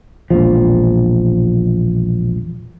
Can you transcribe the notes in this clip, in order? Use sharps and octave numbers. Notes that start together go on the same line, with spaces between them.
E1 A#1 F3